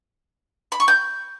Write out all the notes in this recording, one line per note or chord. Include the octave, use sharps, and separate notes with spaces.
B5
C#6
G6